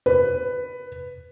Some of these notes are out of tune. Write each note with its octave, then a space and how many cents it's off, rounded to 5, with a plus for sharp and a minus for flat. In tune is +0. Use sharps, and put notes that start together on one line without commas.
B4 +10